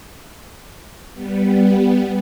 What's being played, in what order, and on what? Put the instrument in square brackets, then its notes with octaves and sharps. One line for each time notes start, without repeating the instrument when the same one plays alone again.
[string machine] G3 B3